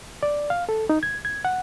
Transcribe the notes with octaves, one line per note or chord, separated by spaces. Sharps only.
D5
F5
A4
D#4
G#6
G#6
F#5